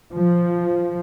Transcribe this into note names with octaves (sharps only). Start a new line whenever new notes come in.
F3